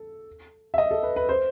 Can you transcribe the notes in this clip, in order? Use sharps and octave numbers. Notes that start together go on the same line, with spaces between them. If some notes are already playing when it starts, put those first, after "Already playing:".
Already playing: A4
E5
D#5
A4
B4
B4
C5